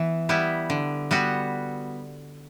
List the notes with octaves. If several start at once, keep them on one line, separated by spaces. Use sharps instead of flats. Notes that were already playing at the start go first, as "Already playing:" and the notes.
Already playing: E3 B3
G3 B3 E4
D3
G3 B3 F#4